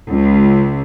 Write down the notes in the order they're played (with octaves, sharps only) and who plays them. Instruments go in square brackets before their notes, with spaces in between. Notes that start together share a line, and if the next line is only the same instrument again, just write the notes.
[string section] C#2